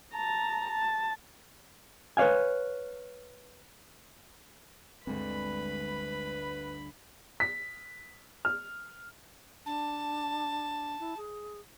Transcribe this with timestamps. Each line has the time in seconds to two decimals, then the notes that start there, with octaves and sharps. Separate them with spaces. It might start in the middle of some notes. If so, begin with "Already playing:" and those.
0.13 A5 A#5
0.70 A5
2.17 B4 C#5 D5 F5 G#5
5.07 G1 D2 G#3 C4 B4 B5
7.40 B6
8.45 F6
9.66 D4 A5
11.00 E4
11.17 G#4